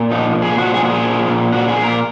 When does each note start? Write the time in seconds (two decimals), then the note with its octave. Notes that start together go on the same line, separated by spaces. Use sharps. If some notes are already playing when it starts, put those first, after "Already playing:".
Already playing: A#2
0.11 F3 D#4
0.35 A#2
0.42 G#4
0.58 F3 F#4
0.74 G#4
0.82 A#2 F#4
0.90 G#4
1.05 F3
1.29 A#2
1.52 F3 F#4
1.68 G#4
1.76 A#2
1.83 A#4